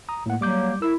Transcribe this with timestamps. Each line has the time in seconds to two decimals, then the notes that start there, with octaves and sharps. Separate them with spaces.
0.09 A#5 D#6
0.26 A2 A#3 F#5
0.41 F#3 G3 A#3 D6 G6
0.82 E4 A#4 E6